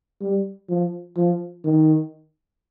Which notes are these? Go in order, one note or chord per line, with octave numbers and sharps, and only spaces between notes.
G3
F3
F3
D#3